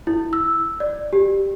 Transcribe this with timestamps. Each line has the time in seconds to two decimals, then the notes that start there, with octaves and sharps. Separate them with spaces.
0.07 E4
0.33 E6
0.80 D5
1.13 G4